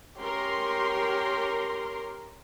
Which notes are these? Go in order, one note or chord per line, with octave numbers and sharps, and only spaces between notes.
C#4 G4 A#4 C6